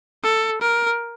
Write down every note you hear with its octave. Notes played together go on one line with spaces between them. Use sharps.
A4
A#4